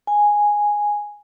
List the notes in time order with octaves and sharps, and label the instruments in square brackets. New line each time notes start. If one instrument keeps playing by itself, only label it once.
[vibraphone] G#5